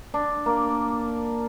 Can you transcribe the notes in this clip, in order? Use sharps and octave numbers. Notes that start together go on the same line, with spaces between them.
D4
A#3